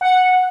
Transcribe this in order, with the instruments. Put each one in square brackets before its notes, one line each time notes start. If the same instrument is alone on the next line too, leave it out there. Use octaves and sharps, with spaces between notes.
[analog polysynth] F#5